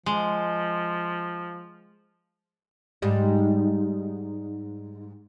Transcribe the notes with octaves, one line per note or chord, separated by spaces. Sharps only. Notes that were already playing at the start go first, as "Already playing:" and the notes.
F3 G#3
G#2 G3